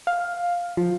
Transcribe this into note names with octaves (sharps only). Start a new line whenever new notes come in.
F5
F3